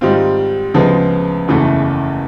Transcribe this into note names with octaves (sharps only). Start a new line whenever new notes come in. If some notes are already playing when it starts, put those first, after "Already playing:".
G#2 D#3 G3 C4 F4
D2 C#3 F3 G#3 B3
F#1 E2 C#3 E3 A3